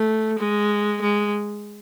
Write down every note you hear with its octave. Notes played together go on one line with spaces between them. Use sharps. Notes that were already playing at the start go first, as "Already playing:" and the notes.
Already playing: A3
G#3
G#3